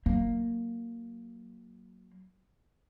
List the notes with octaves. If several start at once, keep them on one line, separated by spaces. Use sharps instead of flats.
F#3 A#3